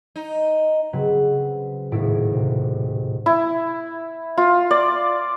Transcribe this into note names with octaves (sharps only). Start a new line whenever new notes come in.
D#4
C#3 F#3 C4 B4
D#1 G#1 A2 E4 D7
C3
E4
F4
D5